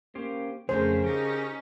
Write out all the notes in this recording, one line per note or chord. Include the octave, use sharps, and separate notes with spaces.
A#3 C#4 G4 C5
F2 C#3 A3 C#4 G#4 A#4 C5
C#4 D#4 G4 A#4